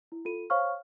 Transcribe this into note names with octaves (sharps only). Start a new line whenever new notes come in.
E4
F4 A4 D#7
C5 C#5 F5 C#6 F6